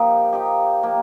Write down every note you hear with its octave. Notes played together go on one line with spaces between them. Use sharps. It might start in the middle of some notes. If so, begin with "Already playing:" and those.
Already playing: F3 A#3 D#4 G4
F3 D#4 G4
F3 A#3 G4